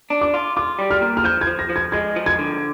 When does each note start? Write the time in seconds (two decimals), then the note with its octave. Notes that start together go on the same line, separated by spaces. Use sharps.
0.10 D4
0.21 D6
0.34 F4
0.57 F4 D6
0.79 G3
0.91 F6
1.01 A#2
1.17 F6
1.24 F3 G6
1.41 G#6
1.47 F3
1.59 A#6
1.70 F3
1.76 G#6
1.92 G#3 G#6
2.16 F3
2.26 G#6
2.39 D3